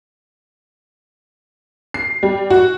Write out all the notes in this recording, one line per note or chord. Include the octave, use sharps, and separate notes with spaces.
C7
G3
F#4